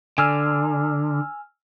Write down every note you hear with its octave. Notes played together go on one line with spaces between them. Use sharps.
D3 G#5 E6 F6